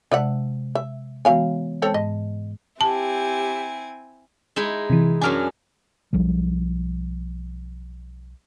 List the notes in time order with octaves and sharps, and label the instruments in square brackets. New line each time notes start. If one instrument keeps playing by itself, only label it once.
[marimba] C3 G#3 [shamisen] D4 E5 F#5
[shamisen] E5
[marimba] E3 G#3 B3 [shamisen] F#3 F5 G#5
[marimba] G#3 A5 [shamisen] C4 A4 C#5
[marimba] G#2 [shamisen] D#5
[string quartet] C4 E4 G#5 [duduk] G4 [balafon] A5
[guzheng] G#3 D#4 E4
[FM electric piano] C3 E3
[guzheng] F#2 F#3 D4 [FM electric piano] G#5 F6
[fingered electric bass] B1 F3 G3